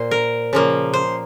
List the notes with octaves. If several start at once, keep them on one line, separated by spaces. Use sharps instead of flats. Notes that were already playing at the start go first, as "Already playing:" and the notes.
Already playing: A#2 C5
A#4
C#3 F3 A#3
C5